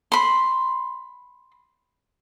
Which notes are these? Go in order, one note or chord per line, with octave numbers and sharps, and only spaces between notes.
B5 C6